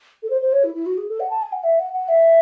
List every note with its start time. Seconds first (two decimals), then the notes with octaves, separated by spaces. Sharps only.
0.23 A4
0.30 C5
0.41 C5
0.53 C#5
0.64 E4
0.74 E4
0.86 F#4
0.98 G#4
1.09 A4
1.20 F#5
1.30 A5
1.42 G#5
1.52 F#5
1.64 E5
1.79 F#5
1.93 F#5
2.08 E5